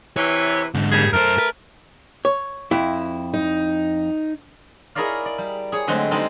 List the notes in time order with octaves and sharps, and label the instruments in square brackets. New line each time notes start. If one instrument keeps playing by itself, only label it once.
[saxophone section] C3 E3 [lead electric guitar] C#5
[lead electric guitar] G#2 D3
[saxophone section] D#2 G3 G#4
[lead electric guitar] F#2 C5 [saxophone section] A3 A#4
[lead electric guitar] B4
[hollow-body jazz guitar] C#5
F2 E4
[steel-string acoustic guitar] D#4
[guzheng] E4 G#4 A#4 C#5 D5 F5
D5
G3
G#4 C#5
D3 F#3 G#3 A3 C4
G3 G#3 C4 D#4 A4